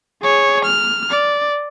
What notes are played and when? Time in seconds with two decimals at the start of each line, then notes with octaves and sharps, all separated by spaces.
0.23 G#4 C#5
0.65 F6
1.11 D5